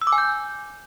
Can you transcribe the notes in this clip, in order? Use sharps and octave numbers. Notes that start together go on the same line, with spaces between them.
E6
D6
G#5
G6